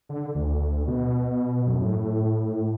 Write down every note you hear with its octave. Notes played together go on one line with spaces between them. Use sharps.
D3
D2
B2
F#2
A2